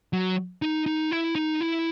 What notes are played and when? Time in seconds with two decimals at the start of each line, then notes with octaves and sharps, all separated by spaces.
0.13 F#3
0.62 D#4
0.86 D#4
1.11 E4
1.35 D#4
1.61 E4